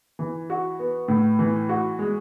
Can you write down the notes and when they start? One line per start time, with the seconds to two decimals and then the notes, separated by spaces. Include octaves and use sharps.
0.19 E3
0.50 F#4
0.79 B3
1.08 A2
1.39 E3
1.69 F#4
1.99 G#3